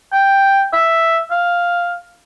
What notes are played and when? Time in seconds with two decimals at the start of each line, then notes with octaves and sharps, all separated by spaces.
0.12 G5
0.73 E5
1.31 F5